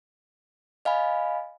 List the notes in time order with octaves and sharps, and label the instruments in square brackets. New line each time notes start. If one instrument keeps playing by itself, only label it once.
[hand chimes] D#5 F5 G#5 B5